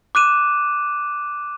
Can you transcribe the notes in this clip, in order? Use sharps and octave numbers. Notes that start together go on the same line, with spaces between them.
D6 F#6 D#7 E7